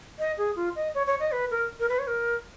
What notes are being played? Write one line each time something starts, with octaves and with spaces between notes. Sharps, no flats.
D#5
G#4
F4
D#5
C#5
C#5
D#5
B4
A#4
A#4
B4
C#5
A#4